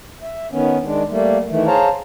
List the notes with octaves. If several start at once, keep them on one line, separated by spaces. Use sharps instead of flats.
E5
D#3 B3 C#4
D#3 G#3 D4
G3 A3 A#3
D#3 E3 A3
G#4 C5 C#5 F5 A5 A#5